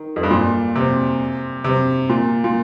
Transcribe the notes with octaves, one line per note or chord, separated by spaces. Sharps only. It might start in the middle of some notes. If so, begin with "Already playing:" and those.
Already playing: D#3
F2
G2
A#2
C3
C3
A#2
A#2